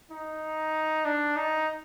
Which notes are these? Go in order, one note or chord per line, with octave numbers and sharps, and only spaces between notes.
D#4
D4
D#4